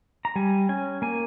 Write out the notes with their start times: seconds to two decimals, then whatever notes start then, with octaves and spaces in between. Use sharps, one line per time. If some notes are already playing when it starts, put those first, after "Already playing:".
0.25 A#5
0.36 G3 G#5
0.69 C#4 G#5
1.02 A#3 G#5